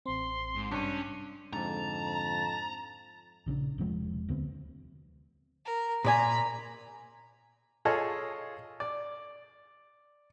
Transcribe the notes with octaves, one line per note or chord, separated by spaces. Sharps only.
A1 C4 C6
G#2
G2 C3 C#4 C#6 B6
F2 G#2 D3 A5 A#5
A#1 C#3 F3 D4
E1 C3 F3 G#3
D2 D3 B3 C4
A#4
A#2 D5 G#5 A#5 B5
F4 G#4 A4 C#5 D#5
D5